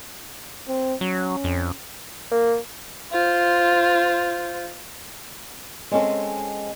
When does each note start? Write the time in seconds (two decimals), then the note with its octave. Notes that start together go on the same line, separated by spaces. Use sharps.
0.68 C4
1.01 F#3 C#4
1.44 F2
2.31 A#3
3.12 F4 C5
5.92 G#3 C4 C#4 A4